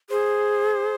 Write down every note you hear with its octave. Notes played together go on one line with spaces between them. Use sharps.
G#4 C5